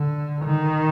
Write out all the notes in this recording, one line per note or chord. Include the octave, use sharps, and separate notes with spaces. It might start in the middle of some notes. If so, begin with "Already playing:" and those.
Already playing: D3
D#3